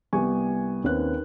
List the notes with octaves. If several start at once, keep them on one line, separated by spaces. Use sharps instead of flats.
C2 B3 G4 G#5 C#6
D#2 C4 C#4 B4 F#6